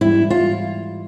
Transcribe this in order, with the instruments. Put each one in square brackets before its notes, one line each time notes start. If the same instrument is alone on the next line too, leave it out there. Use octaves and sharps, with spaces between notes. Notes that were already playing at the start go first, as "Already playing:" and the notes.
[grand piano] G#2 E3 G3 [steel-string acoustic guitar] E4
[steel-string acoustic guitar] F4